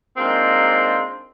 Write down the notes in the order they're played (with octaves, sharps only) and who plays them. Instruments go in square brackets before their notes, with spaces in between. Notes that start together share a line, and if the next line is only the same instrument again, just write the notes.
[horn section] G#3 A#3 C4 D4 D#4 F4